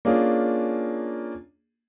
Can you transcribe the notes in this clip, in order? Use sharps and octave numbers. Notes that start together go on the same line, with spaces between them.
A#3 C#4 D4 F4 G#4